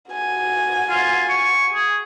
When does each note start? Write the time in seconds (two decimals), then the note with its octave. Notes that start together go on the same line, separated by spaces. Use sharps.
0.12 F#4 G#5
0.90 F4
1.30 C#6
1.74 G#4